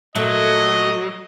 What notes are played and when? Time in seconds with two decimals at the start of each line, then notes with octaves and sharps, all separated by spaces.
0.15 A#2 F#3 A3 D#5